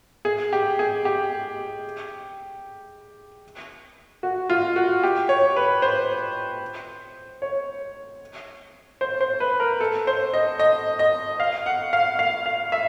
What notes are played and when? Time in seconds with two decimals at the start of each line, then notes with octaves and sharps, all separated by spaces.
0.25 G#4
0.53 G4
0.79 G#4
1.05 G4
4.23 F#4
4.50 F4
4.76 F#4
5.03 G4
5.29 C#5
5.56 B4
5.82 C5
7.42 C#5
9.01 C5
9.21 C5
9.40 B4
9.60 A#4
9.81 A4
10.07 C5
10.34 D#5
10.59 D#5
10.99 D#5
11.40 F5
11.66 F#5
11.93 F5
12.19 F5
12.46 F5
12.72 E5